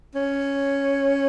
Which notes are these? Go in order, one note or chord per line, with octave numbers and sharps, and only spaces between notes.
C#4